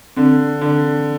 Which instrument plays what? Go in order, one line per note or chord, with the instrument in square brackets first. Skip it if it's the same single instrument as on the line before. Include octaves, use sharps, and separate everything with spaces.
[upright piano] D3 [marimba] C4
[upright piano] D3